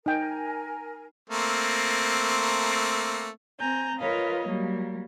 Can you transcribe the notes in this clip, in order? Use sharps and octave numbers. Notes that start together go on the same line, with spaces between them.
D#4 A#4 G5 G#5
A3 A#3 C4
C4 G#5 A#5 G6
F4 A#4 B4 C#5 D#5 F5
F#3 G3 A#3